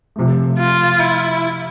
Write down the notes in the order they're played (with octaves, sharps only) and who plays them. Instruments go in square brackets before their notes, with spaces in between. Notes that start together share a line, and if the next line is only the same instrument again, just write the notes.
[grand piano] C3 F3 A3
[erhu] F4
E4